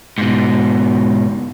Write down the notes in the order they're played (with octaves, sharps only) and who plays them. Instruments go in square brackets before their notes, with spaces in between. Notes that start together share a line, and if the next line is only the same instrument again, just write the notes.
[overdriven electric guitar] G#2 B2